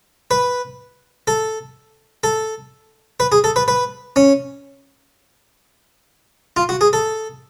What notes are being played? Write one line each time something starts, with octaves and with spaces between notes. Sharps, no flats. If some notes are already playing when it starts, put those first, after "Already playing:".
B4
A4
A4
B4
G#4
A4
B4
B4
C#4
F4
F#4
G#4
A4